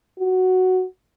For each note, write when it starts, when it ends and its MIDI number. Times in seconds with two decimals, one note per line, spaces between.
0.19 0.84 66